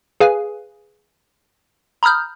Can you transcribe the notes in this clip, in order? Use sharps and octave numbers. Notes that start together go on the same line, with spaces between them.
G#4 B4 F5 G#5
A#5 B5 D#6 F6 G6